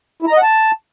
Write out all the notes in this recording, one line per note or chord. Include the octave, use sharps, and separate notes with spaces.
E4
A#5
D#5
F#5
A5